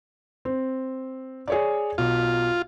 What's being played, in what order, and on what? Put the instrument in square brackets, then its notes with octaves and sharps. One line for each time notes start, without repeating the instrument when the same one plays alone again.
[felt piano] C4
G#4 C#5 D5
[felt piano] B1 [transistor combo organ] F4